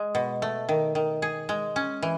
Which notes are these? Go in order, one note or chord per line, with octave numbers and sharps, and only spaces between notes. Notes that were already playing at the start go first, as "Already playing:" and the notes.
Already playing: G#3
B2
A3
D#3
D#3
G#4
G#3
C#4
E3